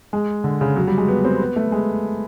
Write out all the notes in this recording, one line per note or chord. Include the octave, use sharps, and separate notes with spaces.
G#3
D3
C#3
F#3
G3
G#3
B3
C4
B3
A3
G#3